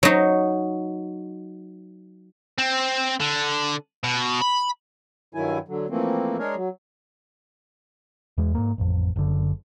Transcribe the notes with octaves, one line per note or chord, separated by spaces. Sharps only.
F#3 D#4
C4
D3
B2
B5
G2 D#3 F#3 E4 G#5
D3 F#3
E3 F3 A3 A#3 C4
G#3 D4 G#4 A#4 C#5
F#3
E2 G#3
G#2 A#3
A1 F2
F#1 D3